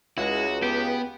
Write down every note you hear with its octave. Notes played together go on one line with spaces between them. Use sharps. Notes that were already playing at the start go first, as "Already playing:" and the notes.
C#2 G#3 E4 F#4
B3 G4 G5